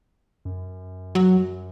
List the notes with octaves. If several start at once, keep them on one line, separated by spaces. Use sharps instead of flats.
F#2
F#3